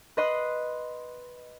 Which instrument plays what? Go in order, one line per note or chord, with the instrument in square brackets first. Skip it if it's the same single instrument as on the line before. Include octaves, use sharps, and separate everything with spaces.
[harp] B4 D#5 C6 F#6